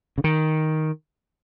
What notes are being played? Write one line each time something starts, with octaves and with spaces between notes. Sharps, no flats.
C#3
D#3